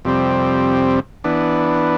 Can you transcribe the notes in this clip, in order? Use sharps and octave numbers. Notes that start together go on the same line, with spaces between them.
F2 C3 G3 C4
E3 B3 D4